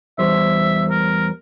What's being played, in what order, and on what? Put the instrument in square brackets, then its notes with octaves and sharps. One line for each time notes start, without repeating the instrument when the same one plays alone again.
[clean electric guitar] E2 G3 C5 [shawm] E5
[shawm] A#4